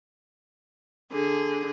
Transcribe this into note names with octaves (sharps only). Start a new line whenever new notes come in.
D3 G#4